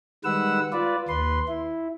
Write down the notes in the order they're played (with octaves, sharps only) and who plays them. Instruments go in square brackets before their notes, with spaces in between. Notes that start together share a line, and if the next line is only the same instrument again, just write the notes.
[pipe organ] D#3 G3 G#3 B4 F#5 E6
F4 B4 D5
D#2 B4 C6
E4